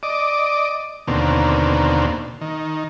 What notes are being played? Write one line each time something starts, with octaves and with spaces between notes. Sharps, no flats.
D5 D#5 D6
D#2 B2 D3 A#3 C4
D#3